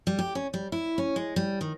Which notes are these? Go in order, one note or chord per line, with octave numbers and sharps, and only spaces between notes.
G3
G4
C#4
G3
E4
C#4
G#3
G3
D#3